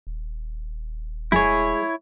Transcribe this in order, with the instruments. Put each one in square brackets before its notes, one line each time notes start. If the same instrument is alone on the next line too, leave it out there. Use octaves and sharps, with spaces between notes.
[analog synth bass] D#1
[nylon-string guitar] G#3 G#4 [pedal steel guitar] E4 C#5